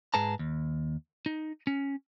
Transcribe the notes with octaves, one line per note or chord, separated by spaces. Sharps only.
G#2 G#4 B4 A5 A#5
D#2
D#4
C#4